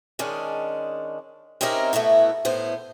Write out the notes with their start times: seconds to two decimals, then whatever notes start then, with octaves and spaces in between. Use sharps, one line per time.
0.19 D#3 G#3 C#4 D4
1.61 C4 C#4 D#4 E4 G4 A#4
1.93 A2 A3 B3 E4 F#4
2.45 A2 B3 C5